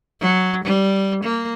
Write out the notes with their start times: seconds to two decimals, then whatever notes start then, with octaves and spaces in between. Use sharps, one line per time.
0.21 F#3
0.65 G3
1.24 A#3